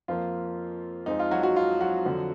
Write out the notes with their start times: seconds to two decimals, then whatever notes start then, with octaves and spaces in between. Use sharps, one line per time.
0.08 F2 F3 A#3 F4
1.06 F2 F3 G#3 D#4
1.19 F4
1.31 F#3 F#4
1.43 F#3 F#4
1.56 F4
1.81 F#3 F#4
2.05 F2 D3 F3